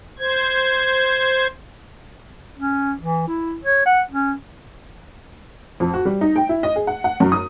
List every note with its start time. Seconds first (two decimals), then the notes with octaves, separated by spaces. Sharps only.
0.19 C5 G#6
2.58 C#4
3.00 E3
3.27 E4
3.63 C#5
3.86 F#5
4.11 C#4
5.80 F2
5.94 F#4
6.05 G3
6.21 D#4
6.36 G5
6.49 E4
6.63 D#5
6.76 G#4
6.87 F#5
7.04 F#5
7.20 F#2
7.32 D#6